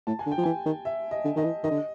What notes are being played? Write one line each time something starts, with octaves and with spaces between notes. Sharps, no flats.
A2 A5
G#5
D3
G5
F3
E3 G#5
D#3
E5
D#5
D3
D#3 D#5
E3
D#3 D#5
D3